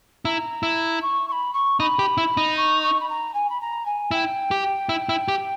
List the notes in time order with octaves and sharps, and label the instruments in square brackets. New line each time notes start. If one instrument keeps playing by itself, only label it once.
[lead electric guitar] E4 [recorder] A#5
[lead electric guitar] E4
[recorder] C#6
C#6
B5
C#6
[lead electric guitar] D#4 [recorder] B5
[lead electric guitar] G4
E4
D#4
[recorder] C#6
C#6
B5
A#5
G#5
B5
A#5
G#5
[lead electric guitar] E4 [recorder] G5
[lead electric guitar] G4
E4
E4
G4